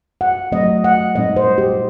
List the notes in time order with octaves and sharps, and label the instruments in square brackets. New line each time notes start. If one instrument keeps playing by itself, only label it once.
[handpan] F#5
F#3 A3 C4 D#5
F#5
A#2 G3 C4 D#4 D#5
C5
G4